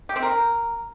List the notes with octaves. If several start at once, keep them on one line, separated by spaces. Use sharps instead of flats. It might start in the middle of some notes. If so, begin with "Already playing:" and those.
G4
C4
A#4